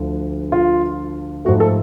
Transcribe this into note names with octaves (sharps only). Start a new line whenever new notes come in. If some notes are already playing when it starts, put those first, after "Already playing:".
Already playing: D2 D3 F3
F4
G#2 F3 A3 F#4
A4